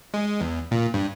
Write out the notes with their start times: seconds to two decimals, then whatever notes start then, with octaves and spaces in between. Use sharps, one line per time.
0.14 G#3
0.41 E2
0.71 A#2
0.94 G2